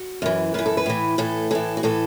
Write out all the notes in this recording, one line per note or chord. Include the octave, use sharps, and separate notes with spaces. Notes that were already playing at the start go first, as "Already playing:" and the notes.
Already playing: F#4
F#2 E3
F#2 E3 B4
A4
B4
A2 E3
A2 E3 A4
A2 E3 A4
F#4
A2 E3 A4